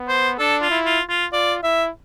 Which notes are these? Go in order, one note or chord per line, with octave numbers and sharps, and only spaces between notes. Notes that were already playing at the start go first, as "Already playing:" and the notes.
Already playing: B3
C5
D4 A4
F4
E4
F4
F4
F4 D5
E4 E5